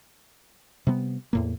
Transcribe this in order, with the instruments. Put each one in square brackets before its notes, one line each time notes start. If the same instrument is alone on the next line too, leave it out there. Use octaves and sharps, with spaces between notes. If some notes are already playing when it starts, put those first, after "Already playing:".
[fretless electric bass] C3 G3 B3
E2 A2 A#3